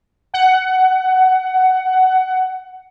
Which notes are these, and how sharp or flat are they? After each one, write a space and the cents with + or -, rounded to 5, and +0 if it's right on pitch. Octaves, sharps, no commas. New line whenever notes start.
F#5 +15